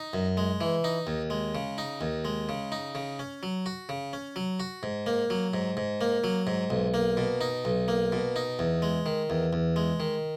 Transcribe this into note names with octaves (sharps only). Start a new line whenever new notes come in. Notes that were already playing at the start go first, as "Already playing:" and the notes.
Already playing: D#4
F#2
G#3
E3
D#4
D#2
G#3
C#3
D#4
D#2
G#3
C#3
D#4
C#3
C#4
F#3
F#4
C#3
C#4
F#3
F#4
G#2
A#3
F#3
G#2
G#2
A#3
F#3
G#2
B1
A#3
B2
D#4
B1
A#3
B2
D#4
E2
G#3
D#3
E2
E2
G#3
D#3